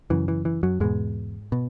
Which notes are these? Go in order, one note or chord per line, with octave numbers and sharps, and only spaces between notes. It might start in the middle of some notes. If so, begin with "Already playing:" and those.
F#2 C#3 E3
E3
E3
F#2 F#3
E2 G#2 B2 G#3
B2